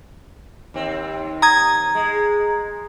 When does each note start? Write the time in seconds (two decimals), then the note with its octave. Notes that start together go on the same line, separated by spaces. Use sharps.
0.74 D#2 C4
1.42 A#5 D#6 G#6
1.95 G#3